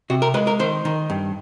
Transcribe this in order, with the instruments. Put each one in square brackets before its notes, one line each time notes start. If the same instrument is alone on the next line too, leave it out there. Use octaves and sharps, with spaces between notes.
[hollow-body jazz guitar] C3 F#4
A#4
G#3 B4
A#4
D#3 C5
D#3
G2